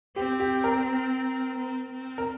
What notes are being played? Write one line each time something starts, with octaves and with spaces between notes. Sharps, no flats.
C4 G4
G4
A#4
C4
C4
A#4